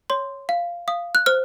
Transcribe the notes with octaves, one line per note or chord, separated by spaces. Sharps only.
C#5 C6
F5
F5 D#6
F#6
C5 F6